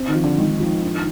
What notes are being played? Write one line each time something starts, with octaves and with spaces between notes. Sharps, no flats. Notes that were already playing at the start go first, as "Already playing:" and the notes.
Already playing: C4
D#3
F3
D3
D#3 G#3
F3
D4